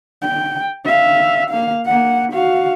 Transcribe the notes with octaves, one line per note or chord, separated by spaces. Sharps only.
G5
E5 F5
A#3 F5
A#3 F#5
F#4 F5